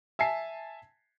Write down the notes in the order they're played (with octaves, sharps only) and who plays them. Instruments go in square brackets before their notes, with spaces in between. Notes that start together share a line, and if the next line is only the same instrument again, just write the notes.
[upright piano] E5 G#5 A5 C7